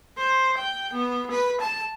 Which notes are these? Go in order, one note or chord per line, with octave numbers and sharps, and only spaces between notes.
C5
G5
B3
B4
A5